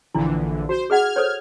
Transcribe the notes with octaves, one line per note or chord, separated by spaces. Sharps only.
A#1 D3 E3 D4 E4
F#4 C5
G#4 D#5 F#5 F6 G#6
A4 C5 C#5